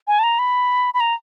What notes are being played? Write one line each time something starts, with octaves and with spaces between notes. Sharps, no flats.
G#5
A5
A#5
B5
B5
A#5